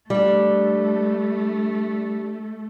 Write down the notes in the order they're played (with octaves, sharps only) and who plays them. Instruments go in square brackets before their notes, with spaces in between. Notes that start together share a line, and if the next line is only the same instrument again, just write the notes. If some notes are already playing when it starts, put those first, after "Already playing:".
[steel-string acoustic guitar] G3 D4 [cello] A3